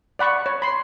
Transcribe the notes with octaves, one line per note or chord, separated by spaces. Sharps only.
D5 F#5 B5 C#6
C#5
B5 C6